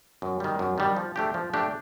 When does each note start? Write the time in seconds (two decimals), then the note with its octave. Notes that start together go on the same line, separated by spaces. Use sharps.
0.22 F#2
0.40 D#3 G3
0.59 F#2
0.78 D#3 G3
0.96 F3
1.16 A3 D4 G4
1.34 F3
1.53 A3 D4 G4